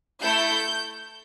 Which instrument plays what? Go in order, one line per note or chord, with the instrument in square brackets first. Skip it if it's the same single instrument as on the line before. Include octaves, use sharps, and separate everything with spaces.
[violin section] A3 E4 A4 G6